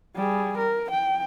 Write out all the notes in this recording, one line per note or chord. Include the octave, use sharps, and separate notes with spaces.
G3 G#4
A#4
G5